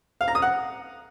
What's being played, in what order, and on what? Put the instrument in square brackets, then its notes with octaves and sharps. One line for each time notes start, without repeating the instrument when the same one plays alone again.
[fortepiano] F5
A#5
D#6
F#5